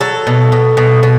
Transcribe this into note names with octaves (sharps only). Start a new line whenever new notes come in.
F#3 A4
B2
B2
B2
B2